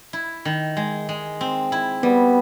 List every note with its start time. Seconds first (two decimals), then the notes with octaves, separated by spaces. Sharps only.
0.13 E4
0.45 D#3
0.77 G#3
1.09 G#3
1.41 C4
1.72 E4
2.03 G3 B3